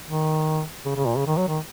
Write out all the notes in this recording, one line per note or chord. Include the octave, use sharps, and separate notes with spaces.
D#3
C#3
C#3
A#2
C#3
D#3
F#3
D#3